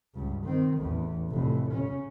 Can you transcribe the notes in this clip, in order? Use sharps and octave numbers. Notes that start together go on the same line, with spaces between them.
C#2 G2
D#3 C4
A1 E2
F1 A2
C#3 C#4